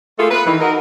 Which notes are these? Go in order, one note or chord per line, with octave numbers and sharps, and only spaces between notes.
A3 A#3 F4 G#4 A4
B4
D#3 E3
D#4 F#4 A#4